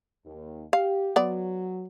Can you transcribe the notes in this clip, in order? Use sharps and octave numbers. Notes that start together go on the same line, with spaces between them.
D#2
G4 F5
F#3 B3 D5